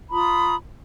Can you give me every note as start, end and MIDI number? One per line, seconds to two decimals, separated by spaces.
0.11 0.55 65
0.11 0.55 82
0.11 0.55 83
0.11 0.55 87